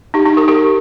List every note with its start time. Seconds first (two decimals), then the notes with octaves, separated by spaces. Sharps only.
0.14 D#4 G4
0.26 D#4 G4
0.37 G4 A#4
0.48 G4 A#4